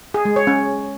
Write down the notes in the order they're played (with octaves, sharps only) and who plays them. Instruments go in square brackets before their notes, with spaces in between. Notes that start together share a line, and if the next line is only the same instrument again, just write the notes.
[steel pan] G#4
G#3
C#5
C#4